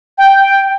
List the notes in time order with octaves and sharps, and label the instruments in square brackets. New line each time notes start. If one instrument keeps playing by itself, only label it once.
[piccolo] G5